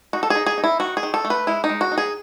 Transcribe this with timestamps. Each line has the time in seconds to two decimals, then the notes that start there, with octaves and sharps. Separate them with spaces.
0.13 D#4 F#4
0.23 A4
0.30 D#4 G#4
0.46 G#4
0.58 D#4
0.64 E4
0.80 D#3 F#4
0.97 G#4
1.03 D#3
1.14 A4
1.25 A3
1.30 B4
1.47 G#3 E4
1.64 D#4
1.69 G#3
1.81 F#4
1.92 D#4
1.98 G#4